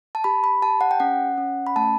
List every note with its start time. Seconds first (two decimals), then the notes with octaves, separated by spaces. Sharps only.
0.15 A5
0.24 G4 B5
0.44 B5
0.62 G4 A5
0.81 F#5
0.91 G5
1.00 C#4 F#5
1.38 C#4
1.67 B5
1.76 A3 A5